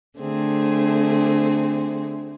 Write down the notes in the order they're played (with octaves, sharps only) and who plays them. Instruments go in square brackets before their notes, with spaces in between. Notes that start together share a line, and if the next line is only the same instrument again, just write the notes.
[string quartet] D3 A3 C4 G#4